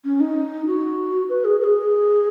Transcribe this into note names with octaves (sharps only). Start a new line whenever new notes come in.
C#4
D#4
F#4
B4
G#4
B4
G#4